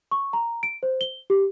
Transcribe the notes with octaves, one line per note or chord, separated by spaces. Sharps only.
C#6
A#5
D7
C5
G7
G4